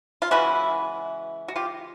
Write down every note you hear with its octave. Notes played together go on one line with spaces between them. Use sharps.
F4
C#3 E3 G#3 E4 F#4
F#4
F4 G4